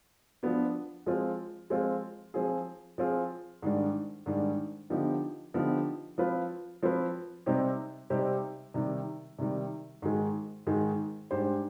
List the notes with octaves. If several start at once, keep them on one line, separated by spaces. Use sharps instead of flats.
F3 B3 D4
F3 G#3 C4 F4
F3 G#3 C4 F4
F3 C4 F4 G#4
F3 C4 F4 G#4
G#2 D#3 G3 D4
G#2 D#3 G3 D4
D3 F3 B3 D#4 G4
D3 F3 B3 D#4 G4
F3 C4 F4 B4
F3 C4 F4 B4
C3 G3 C4 D#4 G4
C3 G3 C4 D#4 G4
C3 D#3 G3
C3 D#3 G3
G#2 D#3 G#3
G#2 D#3 G#3
G#2 G3 D4 G4 C5